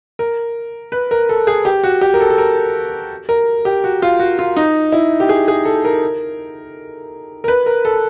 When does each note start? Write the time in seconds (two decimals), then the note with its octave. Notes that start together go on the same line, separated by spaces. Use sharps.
0.19 A#4
0.92 B4
1.11 A#4
1.29 A4
1.47 G#4
1.65 G4
1.84 F#4
2.01 G4
2.14 A#4
2.20 A4
2.30 A4
2.38 A#4
3.29 A#4
3.65 G4
3.84 F#4
4.02 F4
4.20 F#4
4.39 F4
4.56 D#4
4.92 E4
5.20 G4
5.29 G#4
5.48 G#4
5.65 A4
5.85 A#4
7.44 A#4
7.48 B4
7.66 A#4
7.85 A4